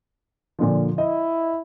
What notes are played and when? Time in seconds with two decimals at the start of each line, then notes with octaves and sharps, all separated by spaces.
0.59 A#2 D3 F3
0.98 E4 D#5